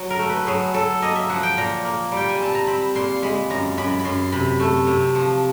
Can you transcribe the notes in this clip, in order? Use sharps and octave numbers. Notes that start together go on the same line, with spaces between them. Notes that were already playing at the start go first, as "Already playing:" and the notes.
Already playing: F#3
A#4
A3
B4
F#3 G#4
F#3 A4
A#3 D#5
E5
F3 F#5
G5
A#2 A#5
A#3
G3 G5
G#5
C4 A5
A#5
C4 B5
A#2 C6
G#3 B5
F#2 A#5
F#2 B5
B5
F#2 C6
C3 B5
A3
C3
F3